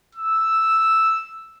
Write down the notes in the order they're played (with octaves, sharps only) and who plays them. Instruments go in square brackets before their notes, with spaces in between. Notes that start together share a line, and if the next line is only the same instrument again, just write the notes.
[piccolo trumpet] E6